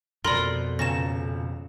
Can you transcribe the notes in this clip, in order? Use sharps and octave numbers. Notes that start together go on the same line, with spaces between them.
F2 B2 A#4 D5 B5 C6
D#1 C#2 C#4 A5 A#5 A#6 E7